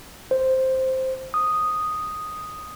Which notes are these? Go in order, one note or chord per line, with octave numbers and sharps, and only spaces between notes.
C5
D#6